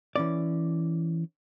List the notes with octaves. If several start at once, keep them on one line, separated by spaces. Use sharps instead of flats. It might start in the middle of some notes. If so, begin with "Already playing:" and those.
E3 C#4 D5